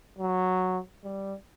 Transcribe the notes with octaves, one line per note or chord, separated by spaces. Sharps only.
F#3
G3